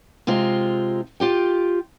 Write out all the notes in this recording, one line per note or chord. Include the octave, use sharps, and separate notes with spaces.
C3 G#3 C4 F4
F4 G4 G5